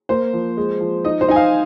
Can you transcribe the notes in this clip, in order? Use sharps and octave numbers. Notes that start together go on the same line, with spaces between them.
A#3 C5
F3
G#3
F3
D#4 D#5
C5
D#4 G#5
F5